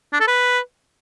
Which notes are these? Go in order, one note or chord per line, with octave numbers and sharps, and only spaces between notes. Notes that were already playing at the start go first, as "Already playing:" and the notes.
D4
A4
B4